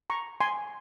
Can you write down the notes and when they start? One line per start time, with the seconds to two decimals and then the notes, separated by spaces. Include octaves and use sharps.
0.10 A#5 C#6
0.41 G#5 C6